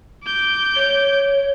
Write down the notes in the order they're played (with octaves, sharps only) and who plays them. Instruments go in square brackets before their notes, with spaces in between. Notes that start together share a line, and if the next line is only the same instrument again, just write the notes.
[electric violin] D6 G6
[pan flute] C#5